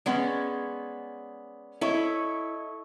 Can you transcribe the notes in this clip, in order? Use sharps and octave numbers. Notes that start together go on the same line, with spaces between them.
G#3 B3 C#4 D5
E4 A4 C#5 D#5 C#6